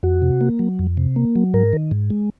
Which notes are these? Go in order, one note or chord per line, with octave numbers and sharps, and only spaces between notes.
F2 F#4
C3
A#3
F#3
F2
C3
A#3
F#3
G#2 A#4
D#3
G#2
G#3